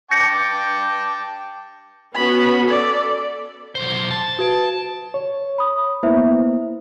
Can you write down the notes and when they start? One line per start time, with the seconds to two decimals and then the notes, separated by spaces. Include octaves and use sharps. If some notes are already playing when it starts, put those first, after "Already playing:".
0.11 G5 A5 D6 G6 A#6 C#7
2.15 B3 C#4 F#4 B5
2.68 A4 D5
3.75 B1 C5
4.11 A5
4.39 F#4 B4 D7
5.14 C#5
5.58 B5 D#6
6.03 A#3 B3 E4 C5 E5